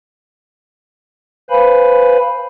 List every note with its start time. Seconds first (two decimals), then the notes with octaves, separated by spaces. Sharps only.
1.50 B4 C5 F5 G#5 B5